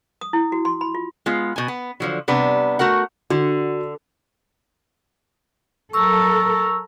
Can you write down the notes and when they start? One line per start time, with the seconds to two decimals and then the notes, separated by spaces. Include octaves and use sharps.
0.21 D#6
0.33 E4
0.52 F#4
0.65 C6
0.81 B5
0.95 F4
1.26 G#3 B3 F4
1.56 B2 G#5
1.68 B3
2.00 D3 F3 F#3
2.28 C3 G3 B3 D4
2.79 A3 F#4 A#4 F#5
3.30 D3 F#4
5.93 F#3 A4 A#4 C#6 E6